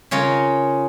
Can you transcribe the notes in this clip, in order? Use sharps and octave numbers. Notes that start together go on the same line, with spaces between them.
C#3 C#4 F4 A#4